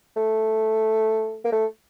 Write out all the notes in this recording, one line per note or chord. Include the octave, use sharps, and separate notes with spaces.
A3
A#3
A3